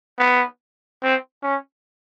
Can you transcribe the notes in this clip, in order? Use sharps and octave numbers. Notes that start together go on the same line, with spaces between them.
B3
C4
C#4